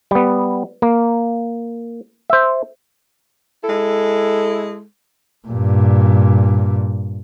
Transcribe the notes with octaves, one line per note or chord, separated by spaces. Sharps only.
G3 B3
A#3
C5 E5
G#3 E4 A4
G2 A#2